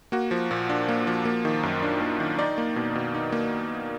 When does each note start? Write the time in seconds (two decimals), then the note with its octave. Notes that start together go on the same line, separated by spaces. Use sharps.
0.12 A#3 F#4
0.31 F3
0.51 A#2
0.69 D4
0.88 A#3
1.07 F3
1.25 A#3
1.45 D#3
1.63 F#2
1.82 D4
2.01 A#3
2.20 D#3
2.39 D#4 D5
2.58 A#3
2.76 B2
2.95 B2
3.15 D#4
3.32 A#3